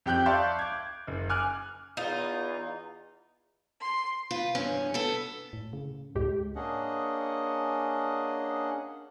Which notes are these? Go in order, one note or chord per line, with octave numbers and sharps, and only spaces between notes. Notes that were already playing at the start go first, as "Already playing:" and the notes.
F2 G4 G5 F#6 G6
D5 E5 F5 A5 C6 C#6
D6 G#6
F#1
G#5 D6 F6 F#6
E2 D#4 F4
C6
F4 B4
E2 G2 C#4
B3 A4
A2
C#3
C#2 A2 G#3 G4
A#3 C#4 D4 G#4 D#5 F#5